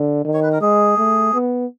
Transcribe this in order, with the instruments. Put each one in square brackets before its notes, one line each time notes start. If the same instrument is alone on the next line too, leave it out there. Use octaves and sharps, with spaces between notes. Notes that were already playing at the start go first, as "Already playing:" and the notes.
Already playing: [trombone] D3
D#3
[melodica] C#5
B4
A#4
[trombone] G#3 [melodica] G#4
[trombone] A3
B3